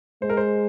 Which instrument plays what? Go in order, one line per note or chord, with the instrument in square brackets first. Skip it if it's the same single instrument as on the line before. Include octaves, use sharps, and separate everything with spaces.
[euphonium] G#3 [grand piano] C5
[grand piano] A#4
C5